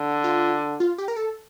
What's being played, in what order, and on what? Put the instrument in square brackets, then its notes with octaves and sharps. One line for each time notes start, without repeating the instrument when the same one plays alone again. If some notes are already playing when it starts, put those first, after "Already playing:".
Already playing: [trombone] D3
[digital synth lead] F4
F4
G4
A#4
A4